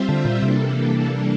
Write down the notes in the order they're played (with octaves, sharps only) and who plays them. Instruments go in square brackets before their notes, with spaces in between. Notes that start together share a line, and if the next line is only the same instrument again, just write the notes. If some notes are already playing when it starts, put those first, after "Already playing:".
Already playing: [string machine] G3 C4 F4 C5 E5
[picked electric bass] D3
A#2
[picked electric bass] C3 [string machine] E3 G3 A#3 D4 A4